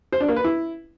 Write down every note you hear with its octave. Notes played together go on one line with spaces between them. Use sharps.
C5
D4
A#3
B4
E4